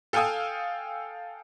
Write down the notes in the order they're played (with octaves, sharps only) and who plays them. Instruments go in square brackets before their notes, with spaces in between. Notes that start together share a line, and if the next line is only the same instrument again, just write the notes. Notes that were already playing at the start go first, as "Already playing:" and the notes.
[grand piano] A4 F5 G5 G#5 D#6 E6